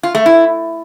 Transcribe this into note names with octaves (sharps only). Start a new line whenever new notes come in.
F4
A3
E4